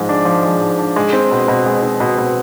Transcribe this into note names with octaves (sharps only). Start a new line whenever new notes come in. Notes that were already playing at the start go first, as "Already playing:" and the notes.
Already playing: G#2 F3 G#3
D4
F3
G#3
G#2
D4
G#3
C4
B2
B2
G#3
C4
B2
B2